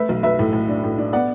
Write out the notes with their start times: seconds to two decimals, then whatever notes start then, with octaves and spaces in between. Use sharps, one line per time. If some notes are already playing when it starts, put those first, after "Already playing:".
Already playing: A3 B4 E5
0.09 B1
0.23 B1 B4 E5
0.39 A2
0.53 A2
0.69 D4
0.84 A2
0.98 D4
1.13 B3 D5 F#5